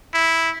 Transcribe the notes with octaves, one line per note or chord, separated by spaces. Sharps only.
E4